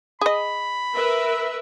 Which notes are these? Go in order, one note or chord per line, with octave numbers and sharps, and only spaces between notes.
G#4 D#5 B5
A#4 B4 E5